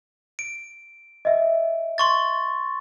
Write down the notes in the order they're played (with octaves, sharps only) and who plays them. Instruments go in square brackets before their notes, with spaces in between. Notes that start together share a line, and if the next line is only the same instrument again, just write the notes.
[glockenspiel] D7
[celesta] D#5 E5
[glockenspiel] C6 C#6 A6